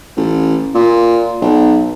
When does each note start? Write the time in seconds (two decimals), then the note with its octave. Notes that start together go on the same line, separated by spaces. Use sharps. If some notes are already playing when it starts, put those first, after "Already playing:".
0.17 A1
0.75 A#2
1.42 B1